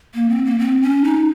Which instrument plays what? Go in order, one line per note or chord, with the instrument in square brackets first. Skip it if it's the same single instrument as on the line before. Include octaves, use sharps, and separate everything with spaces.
[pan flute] A#3
C4
A#3
C4
C#4
D#4